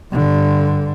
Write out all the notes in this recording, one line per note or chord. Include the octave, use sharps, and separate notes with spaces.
G2 D3